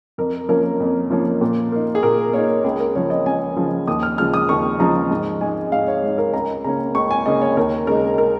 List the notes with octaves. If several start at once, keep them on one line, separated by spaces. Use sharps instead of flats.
F2 A#4
F3 A#3 C#4 A#4
F2
F3 A#3 C#4
A#2
A#3 D#4
G#4
A#2 A#4
A#3 D#4 C#5
C#2 G#4
A#4
C#3 F3 C#5
D#5
C#2 G#5
C#3 F3
D#2 D#6
F6
C#3 F3 G#3 F6
D#6
D#2 C#6
C#3 F3 G#3 A#5
G#2
G#3 D#4 G#5
G#2 F5
C#5
G#3 D#4
A#4
C#2 A#5
C#3 A#3 C#4 A#5
C#2 C#6
G#5
C#3 A#3 C#4 D#5
C#5
D#2 A#4
C#3 G#3 D#4 A#4
A#4